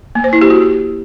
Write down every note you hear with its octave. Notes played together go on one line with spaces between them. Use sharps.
A#3
C5
E4
G4
F#4